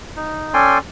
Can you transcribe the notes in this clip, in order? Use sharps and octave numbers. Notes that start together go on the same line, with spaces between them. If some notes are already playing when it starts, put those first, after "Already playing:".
D#4
C#4 A4 D5 G5 G#5 C6